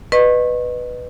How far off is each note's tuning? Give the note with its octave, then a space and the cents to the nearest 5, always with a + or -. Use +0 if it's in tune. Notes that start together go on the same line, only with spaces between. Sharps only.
B4 +0 D#5 -30 C#6 -30